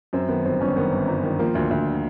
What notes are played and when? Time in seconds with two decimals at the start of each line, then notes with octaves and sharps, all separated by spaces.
0.13 F#2 C4
0.29 D#3 B3
0.45 G1 C4
0.61 G1 C#4
0.76 D#3 B3
0.92 G1
1.07 G1
1.23 D#3
1.39 F3 A#3
1.55 D2
1.71 D2